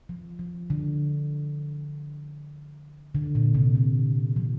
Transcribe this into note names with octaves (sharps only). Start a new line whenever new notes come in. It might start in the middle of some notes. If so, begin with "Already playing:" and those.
F3
F3
D3
D3
A#2
C3
D3
F3